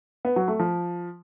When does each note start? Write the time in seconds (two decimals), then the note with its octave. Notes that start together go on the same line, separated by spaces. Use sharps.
0.25 B3
0.36 F#3
0.48 A3
0.60 F3